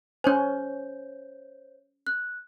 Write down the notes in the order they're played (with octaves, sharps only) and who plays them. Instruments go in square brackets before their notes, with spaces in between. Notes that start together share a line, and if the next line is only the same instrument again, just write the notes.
[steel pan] C#4 G#5 [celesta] C5 C#5 G6
[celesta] F#6